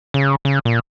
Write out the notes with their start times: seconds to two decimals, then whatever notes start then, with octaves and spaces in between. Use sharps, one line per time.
0.14 C#3
0.45 C#3
0.65 A#2